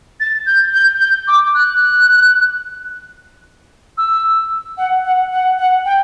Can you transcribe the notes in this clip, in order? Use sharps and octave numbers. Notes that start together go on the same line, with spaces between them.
A6
G6
G6
G6
D6
F#6
E6
F#5
F#5
F#5
F#5
G5